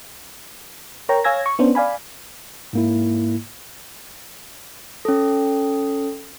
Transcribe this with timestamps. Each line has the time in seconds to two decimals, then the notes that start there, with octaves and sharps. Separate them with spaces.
1.09 A#4 C#5 G5 A#5
1.24 C#5 F5 G#5 E6 G#6 A#6
1.46 C#6
1.59 B3 C#4 D4 C5
1.75 D5 F5 G#5 B5
2.73 G#2 A#3 E4
5.05 C#4 A4